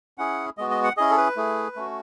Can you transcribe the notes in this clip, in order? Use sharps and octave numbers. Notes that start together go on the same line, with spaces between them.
C#4 E4 G#4 F#5
G#3 B3 F#4 D#5
D#5
F#5
C#4 E4 G#4 D#5
A4
B4
A3 E4 G#4
A3 C#4 F#4